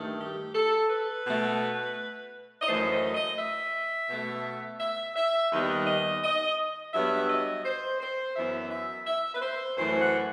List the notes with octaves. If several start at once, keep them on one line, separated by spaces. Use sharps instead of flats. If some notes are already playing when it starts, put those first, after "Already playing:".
Already playing: G2 D#3 A3
G4
A4
B4
B2 A3
D#5
F#2 E3 A3 C5
D#5
D#5
E5
B2 A3
E5
E5
D#2 D#3 G3 B3 D#5
D#5
D#5
G2 F#3 B3 E5
D#5
C5
C5
F#2 E3 B3 E5
E5
E5
B4
C5
F#2 E3 A3 C5
F#5